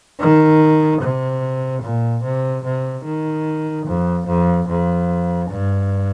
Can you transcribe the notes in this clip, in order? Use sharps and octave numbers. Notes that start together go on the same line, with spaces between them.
D#3
C3
A#2
C3
C3
D#3
F2
F2
F2
G2